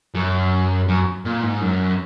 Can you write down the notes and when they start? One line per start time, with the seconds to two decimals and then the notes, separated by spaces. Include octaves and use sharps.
0.14 F#2
0.88 F#2
1.25 A#2
1.43 G#2
1.61 F#2